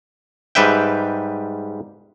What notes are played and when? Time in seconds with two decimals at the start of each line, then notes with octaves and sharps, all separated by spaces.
0.55 G#2 G3 B4 E5 G5